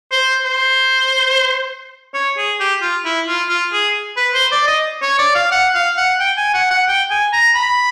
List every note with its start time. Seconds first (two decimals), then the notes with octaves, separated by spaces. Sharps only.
0.11 C5
0.45 C5
2.14 C#5
2.37 G#4
2.60 G4
2.81 F4
3.05 E4
3.27 F4
3.49 F4
3.72 G#4
4.16 B4
4.34 C5
4.51 D5
4.67 D#5
5.02 C#5
5.19 D5
5.35 F5
5.52 F#5
5.74 F5
5.97 F#5
6.20 G5
6.37 G#5
6.54 F#5
6.70 F#5
6.88 G5
7.11 G#5
7.33 A#5
7.55 B5